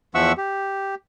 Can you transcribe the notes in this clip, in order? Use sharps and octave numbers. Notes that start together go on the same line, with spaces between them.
E2 F3 E5 F#5 C#6 E6
G4